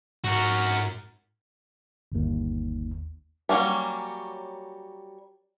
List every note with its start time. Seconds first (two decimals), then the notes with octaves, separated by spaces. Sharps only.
0.24 G#2 F#4 A#4
2.12 G1 D#2
3.49 F#3 G3 A3 A#3 C#4